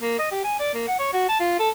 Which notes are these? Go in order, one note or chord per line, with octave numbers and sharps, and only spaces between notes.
A#3
D#5
G4
G#5
D5
A#3
F#5
C#5
F#4
A5
F4
A4